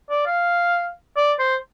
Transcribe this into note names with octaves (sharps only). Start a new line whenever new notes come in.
D5
F5
D5
C5